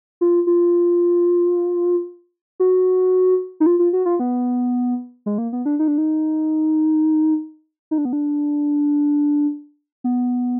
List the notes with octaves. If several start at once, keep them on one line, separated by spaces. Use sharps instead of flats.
F4
F4
F#4
D#4
F4
F4
F#4
F4
B3
G#3
A#3
B3
D4
D#4
D4
D#4
D#4
D4
B3
D4
B3